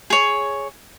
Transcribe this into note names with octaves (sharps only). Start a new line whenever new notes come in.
G#4 C#5